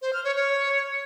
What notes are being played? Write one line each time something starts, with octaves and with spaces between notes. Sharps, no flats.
C5
F6
C#5
C#5